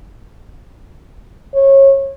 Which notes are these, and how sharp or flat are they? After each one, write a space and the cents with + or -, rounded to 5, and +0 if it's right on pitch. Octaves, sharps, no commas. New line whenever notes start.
C#5 -25